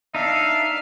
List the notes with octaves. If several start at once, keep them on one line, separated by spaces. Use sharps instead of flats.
D4 D#4 E5 F5